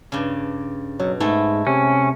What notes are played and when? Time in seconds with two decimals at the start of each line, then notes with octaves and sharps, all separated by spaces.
0.12 G2 C#3
1.00 B2 F#3
1.20 G#2 G#3 A3 E4
1.67 C3 C#4